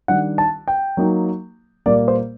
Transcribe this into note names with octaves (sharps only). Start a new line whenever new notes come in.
D#3 G3 D4 F#5
A5
G5
F#3 A#3 D#4
A#2 G3 A#3 D5
C5